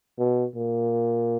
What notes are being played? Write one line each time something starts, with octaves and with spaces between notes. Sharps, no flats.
B2
A#2